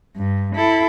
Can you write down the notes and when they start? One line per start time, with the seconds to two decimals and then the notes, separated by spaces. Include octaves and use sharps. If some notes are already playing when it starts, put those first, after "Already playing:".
0.16 G2
0.56 E4 A4